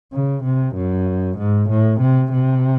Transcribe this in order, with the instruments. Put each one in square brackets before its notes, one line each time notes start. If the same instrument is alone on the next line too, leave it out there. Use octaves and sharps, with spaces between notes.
[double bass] C#3
C3
F#2
G#2
A2
C3
C3